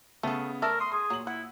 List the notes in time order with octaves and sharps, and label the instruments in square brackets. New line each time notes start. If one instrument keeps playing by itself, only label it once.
[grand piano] C#3 B3 [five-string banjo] A3 A4
[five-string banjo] A3 D5 E5 [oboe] A#4 [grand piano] A5 E6
[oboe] C6 [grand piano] D#6
[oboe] G#4 [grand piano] C6
[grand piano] A#2 F#7 [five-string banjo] F#3
[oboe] E4 [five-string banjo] F#5